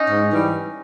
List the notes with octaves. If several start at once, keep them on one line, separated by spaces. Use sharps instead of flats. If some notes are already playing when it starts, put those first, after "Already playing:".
Already playing: C#4 D#4
G#2
E3 G3